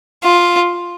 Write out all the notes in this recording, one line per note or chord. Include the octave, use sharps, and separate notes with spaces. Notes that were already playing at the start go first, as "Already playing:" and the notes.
F4